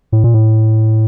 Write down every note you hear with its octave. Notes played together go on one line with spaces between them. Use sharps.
A2
A#2
A2